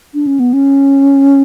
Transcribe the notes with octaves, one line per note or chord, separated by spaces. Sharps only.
D4
C#4
B3
C#4